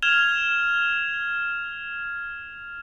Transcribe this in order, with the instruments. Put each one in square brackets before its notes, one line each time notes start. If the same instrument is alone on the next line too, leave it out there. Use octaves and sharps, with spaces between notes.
[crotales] F6 G#6 E7 F7 G7